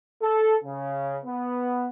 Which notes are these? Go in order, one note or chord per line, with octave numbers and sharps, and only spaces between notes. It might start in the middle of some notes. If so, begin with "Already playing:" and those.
A4
C#3
B3